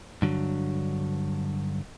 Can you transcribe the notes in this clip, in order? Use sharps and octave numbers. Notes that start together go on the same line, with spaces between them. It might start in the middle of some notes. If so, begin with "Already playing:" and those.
G2 D3 F#3